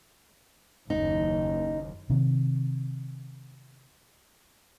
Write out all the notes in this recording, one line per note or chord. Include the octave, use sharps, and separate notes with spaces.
F#1 D#2 D#4
C3 D#3